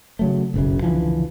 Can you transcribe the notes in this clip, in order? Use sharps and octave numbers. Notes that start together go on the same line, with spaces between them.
C#3 F#3 A3
F#1 B1 F#2 C#3
C#2 D3 E3 F3